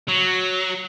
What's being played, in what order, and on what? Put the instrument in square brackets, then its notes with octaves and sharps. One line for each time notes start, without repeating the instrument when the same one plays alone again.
[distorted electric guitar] F#3